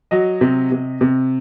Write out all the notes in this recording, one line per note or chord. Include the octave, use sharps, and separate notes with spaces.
F#3 D#5
C3
C3
C3